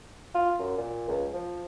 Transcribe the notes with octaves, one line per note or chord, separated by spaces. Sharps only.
F4
F#2
A#2
C#2
F3